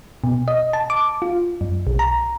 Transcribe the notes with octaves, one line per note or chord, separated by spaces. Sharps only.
B2
D#5
A5
D6
F4
F#2
B1
A#5